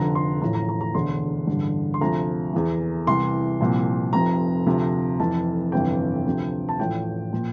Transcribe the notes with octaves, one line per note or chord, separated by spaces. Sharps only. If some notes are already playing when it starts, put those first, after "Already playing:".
Already playing: F1 F2 D3 F3 A#5
C6
A1 A2 F3 A#5
A#5
A#5
A#5
E1 D2 D3 C6
A1 G2 D3
C6
D2 C3 F3 A#5
E2 E3
C2 C3 E3 C6
C2 A#2 F3
F1 F2 C3 F3 A#5
D2 C3 F3
F1 F2 E3 A5
G1 F2 C3 E3 G5
D2 C3 F3
A5
A1 A2 F3 G5
A#2 F3